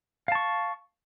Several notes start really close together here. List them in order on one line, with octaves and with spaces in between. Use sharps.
F5 A5 C#6